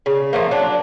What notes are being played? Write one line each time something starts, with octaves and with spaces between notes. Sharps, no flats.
C#3
F3 A3 A#3
F#3 D4